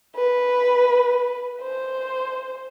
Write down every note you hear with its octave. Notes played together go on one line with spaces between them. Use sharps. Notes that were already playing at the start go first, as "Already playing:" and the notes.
B4
C5